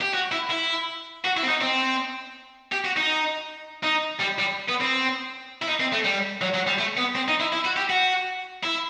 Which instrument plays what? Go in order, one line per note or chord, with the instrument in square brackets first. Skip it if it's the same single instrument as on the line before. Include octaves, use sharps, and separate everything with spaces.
[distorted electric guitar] G4
F#4
E4
E4
F#4
E4
C4
D#4
C4
G4
F#4
D#4
D#4
G3
G3
B3
C4
E4
D#4
C4
A3
G3
F#3
F#3
G3
A3
B3
C4
D#4
E4
E4
F#4
G4
F#4
E4